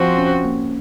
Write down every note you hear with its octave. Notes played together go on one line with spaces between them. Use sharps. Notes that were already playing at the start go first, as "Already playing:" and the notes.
Already playing: F3 C4 F#4
C#4
A#3